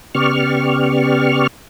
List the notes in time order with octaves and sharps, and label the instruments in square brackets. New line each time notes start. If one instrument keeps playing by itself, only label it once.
[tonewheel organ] C#3 B3 G4 D5 C#6 F6